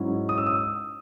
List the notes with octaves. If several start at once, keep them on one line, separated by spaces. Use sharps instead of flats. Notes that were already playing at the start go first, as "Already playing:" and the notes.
Already playing: G#2 F#3 C#4 E4
D#6
E6
D#6